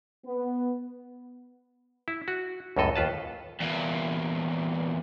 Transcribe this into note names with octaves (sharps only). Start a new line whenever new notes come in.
B3
E4
F#4
C#2 F#2 A2 A4 D#5
D#2 F4 B4 A5
E2 A#2